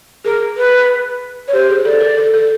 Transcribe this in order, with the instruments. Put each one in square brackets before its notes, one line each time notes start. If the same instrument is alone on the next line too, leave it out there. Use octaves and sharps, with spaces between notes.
[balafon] G#4 [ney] A#4
[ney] B4
C#5
[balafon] G4 [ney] C5
[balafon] G#4
[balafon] A4 [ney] D5
[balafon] A#4
A4
A4